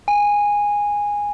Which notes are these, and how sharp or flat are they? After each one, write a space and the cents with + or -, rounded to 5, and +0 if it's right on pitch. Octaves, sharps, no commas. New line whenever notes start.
G#5 -15